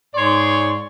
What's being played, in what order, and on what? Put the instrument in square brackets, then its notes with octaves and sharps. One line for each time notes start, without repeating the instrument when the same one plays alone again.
[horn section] G#2 C#5 D5 C6